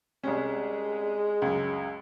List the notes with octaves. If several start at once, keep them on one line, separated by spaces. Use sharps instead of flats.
C2 G#3 C#4
C#2 F#2